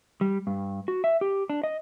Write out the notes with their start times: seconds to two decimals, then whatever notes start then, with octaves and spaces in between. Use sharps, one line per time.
0.21 G3
0.47 G2
0.88 F#4
1.04 E5
1.21 G4
1.50 D4
1.64 D#5